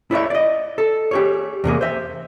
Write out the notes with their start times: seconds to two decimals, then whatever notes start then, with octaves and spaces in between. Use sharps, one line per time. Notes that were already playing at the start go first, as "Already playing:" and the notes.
0.11 E4 C#5 D5 E5
0.30 D5 D#5
0.78 A4
1.11 G4 G#4 C#5
1.64 E2 C3 A#3 G#4
1.81 C5 E5